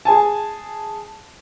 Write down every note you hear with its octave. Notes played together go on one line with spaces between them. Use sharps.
G#4 G#5 A5